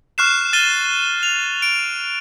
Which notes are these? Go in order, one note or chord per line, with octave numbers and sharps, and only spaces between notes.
C#6 F6 F#6 C7 E7
F6 A6 D#7 G7
F7
D7